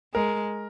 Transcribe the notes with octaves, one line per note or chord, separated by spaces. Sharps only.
G#3 A#4